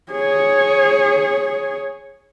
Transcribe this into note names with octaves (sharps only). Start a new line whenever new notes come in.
G#4 C#5